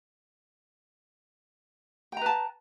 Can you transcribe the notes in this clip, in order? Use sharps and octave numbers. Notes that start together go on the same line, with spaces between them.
B4 G5 A5 A#5